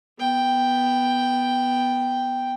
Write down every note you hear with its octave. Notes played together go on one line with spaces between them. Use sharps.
B3 G5